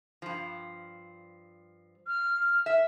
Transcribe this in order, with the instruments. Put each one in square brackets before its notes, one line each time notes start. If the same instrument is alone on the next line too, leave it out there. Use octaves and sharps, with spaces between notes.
[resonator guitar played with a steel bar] G2 F3
[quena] F6
[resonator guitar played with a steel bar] E5